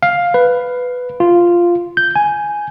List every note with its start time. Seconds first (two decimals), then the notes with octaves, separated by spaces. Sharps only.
0.03 F5
0.34 B4
1.20 F4
1.97 G6
2.16 G#5